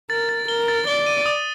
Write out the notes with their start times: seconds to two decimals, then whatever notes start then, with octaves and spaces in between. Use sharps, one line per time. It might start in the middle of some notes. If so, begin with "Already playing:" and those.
0.10 A#4 A6
0.29 A6
0.48 A#4 G7
0.68 A6
0.87 D5 G7
1.06 D#7
1.26 D#6